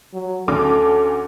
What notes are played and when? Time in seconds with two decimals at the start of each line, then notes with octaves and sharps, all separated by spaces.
0.14 F#3
0.48 D2 C#4 A4 D6